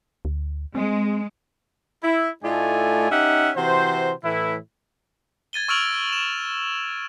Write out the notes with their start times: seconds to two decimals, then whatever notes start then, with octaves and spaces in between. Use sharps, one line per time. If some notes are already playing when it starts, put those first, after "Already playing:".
0.25 D2
0.75 G#3 C4
2.03 E4
2.43 A2 A3 D#4 F4 D5 G#5
3.11 C#4 D#4 G4 E5 F#5
3.56 C3 E3 F#4 C5
4.24 A2 E3 E4
5.53 G#6 A6 D#7 G7
5.68 C#6 E6 F6 D7 F7 F#7
6.10 D7 E7